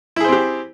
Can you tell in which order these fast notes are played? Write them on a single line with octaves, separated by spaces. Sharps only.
E4 G#4 C5 C4 G4